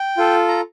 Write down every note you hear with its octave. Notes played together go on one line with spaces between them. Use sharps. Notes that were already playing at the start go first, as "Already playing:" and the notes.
Already playing: G5
F4 A4
A#5